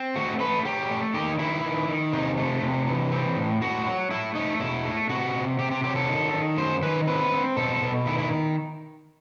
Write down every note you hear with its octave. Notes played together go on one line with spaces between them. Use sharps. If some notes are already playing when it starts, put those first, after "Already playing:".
Already playing: C4
A3 F#4
A3 B4
F#3 G4
A3
D#3 G4
D#3 E4
D#3
D#3
C3 D#4
A3
C3
E3
C4
A2
A2 F#4
F#3
A3 E4
A3 D#4
B2 E4
A3
C3 F#4
C3
C3 G4
G4
F#3 G4
A4
D#3
D#3
F#2 C5
D#3 B4
C4 B4
C4
B2 A4
B2
D#3 E4
E4